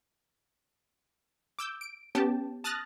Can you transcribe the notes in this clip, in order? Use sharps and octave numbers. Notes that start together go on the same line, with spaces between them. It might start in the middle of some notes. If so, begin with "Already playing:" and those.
D6 E6 G6
D7
B3 C#4 G4 G5 A5
A5 D#6 F6 F#6 A6 A#6